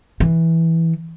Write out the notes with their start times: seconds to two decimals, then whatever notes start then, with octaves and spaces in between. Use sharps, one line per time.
0.20 E3